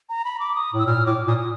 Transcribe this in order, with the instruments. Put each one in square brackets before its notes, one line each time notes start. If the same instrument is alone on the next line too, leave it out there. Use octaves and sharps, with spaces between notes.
[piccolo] A#5
B5
D6
D#6
[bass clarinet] A2
[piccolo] E6
[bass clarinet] A#2 [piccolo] F6
[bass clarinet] A2 [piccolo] D6
[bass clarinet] A#2 [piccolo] D#6
[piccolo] D#6